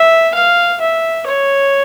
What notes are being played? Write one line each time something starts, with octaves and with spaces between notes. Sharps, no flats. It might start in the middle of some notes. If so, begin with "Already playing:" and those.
Already playing: E5
F5
E5
C#5